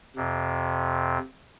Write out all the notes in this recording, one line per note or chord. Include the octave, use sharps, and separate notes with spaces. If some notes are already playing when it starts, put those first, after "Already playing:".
F2 C3